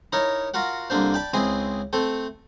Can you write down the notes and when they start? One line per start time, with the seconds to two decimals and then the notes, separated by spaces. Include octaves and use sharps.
0.13 D#4 E4 A#4 C#5
0.54 F4 F#4 A#4 F#5
0.90 C2 D3 A#3 D4 C5
1.14 D5 G5 A5 B5
1.34 C#2 C4 E4 G#4 D#5
1.93 A3 C4 A4